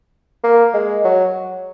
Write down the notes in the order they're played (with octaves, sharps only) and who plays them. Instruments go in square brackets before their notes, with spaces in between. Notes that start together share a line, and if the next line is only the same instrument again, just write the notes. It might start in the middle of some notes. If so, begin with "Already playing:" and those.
[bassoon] A#3
G#3
F#3